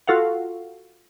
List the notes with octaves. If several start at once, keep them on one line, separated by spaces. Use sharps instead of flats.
F4 F#4 A4 F5 F#5